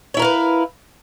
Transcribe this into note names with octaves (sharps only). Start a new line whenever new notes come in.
E4 A#4 B4 C#5 F5